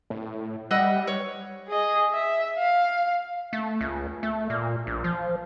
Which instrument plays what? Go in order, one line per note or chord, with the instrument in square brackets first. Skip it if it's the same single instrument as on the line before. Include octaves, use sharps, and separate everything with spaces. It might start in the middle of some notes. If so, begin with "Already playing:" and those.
[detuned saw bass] A2
[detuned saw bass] G3 [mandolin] D#5 E5 F#5
[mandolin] C#5
[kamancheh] G#4 D#5
E5
F5
[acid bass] A3
C#2
A3
A#2
A#1
F3